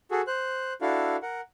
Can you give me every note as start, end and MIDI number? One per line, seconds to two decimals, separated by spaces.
0.11 0.21 66
0.11 0.21 68
0.11 0.21 69
0.27 0.73 72
0.27 0.73 90
0.81 1.17 62
0.81 1.17 64
0.81 1.17 66
0.81 1.17 69
0.81 1.17 77
1.22 1.41 70
1.22 1.41 78